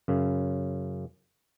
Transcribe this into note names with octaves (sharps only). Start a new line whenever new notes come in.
F#2 C#3